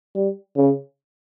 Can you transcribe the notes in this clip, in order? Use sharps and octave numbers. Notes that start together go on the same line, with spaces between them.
G3
C#3